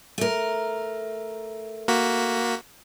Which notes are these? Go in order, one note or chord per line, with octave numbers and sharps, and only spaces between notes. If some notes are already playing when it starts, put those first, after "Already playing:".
A3 A#4
A#3 F#4 B6